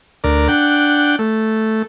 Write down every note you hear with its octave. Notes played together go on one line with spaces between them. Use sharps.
D2 A#4 D5
D4 F#5 G5
A3